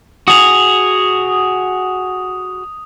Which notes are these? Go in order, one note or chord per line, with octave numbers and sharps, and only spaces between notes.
F#4 G#4 D#6 F7